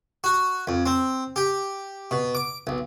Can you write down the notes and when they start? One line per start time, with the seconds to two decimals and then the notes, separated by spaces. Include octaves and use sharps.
0.24 F#4
0.67 F2
0.86 C4
1.36 G4
2.11 B2
2.35 D6
2.67 B1